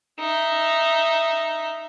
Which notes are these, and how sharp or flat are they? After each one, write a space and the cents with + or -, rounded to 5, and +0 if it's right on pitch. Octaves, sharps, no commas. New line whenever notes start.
D#4 +0 E5 +10